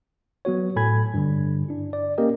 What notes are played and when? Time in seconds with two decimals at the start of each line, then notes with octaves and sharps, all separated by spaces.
0.45 F#3 B3 F#4 C#5
0.76 A2 A4 G#5 B5 G#6
1.14 G2 D3
1.69 D4 E4
1.93 D5
2.18 A#3 C#4 G4 A#4 D#5